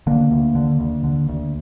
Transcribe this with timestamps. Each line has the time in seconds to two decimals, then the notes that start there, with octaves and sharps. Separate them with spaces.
0.07 D3 A#3
0.31 D2
0.55 D3
0.80 D2
1.04 D3
1.29 D2